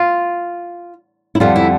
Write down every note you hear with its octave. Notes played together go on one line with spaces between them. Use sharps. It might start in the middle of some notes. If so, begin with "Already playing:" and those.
Already playing: F4
E4
F2 D3 G3 F4
E4